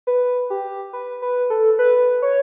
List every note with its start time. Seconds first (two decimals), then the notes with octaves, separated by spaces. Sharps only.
0.07 B4
0.50 G4
0.93 B4
1.22 B4
1.50 A4
1.79 B4
2.22 C#5